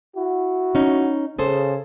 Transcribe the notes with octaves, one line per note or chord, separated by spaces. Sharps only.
E4 F#4
C#4 D#4
C#3 G#4 A4 C5